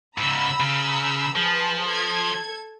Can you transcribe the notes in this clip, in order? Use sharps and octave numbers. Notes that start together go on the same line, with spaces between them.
G#2 C#3 A#5 B5 E6
C#3
F3 G#4 B4 A5
A4 G#6